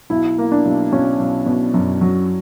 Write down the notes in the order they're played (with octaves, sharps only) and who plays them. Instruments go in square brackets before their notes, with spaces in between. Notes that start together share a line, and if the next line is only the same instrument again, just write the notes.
[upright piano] B1 [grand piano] E4
[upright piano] A#3
[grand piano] D4
[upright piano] B1
[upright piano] B1 [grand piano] C#4
[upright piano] B1
B2
F#2
F#3